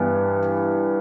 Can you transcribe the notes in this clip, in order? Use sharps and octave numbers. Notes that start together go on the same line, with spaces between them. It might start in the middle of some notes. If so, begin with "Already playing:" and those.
Already playing: G2 E3 B3